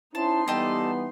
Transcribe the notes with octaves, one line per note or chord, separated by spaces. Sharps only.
C4 C#4 D#4 E4 A5 C6
E3 G3 B3 G4 A4 D#5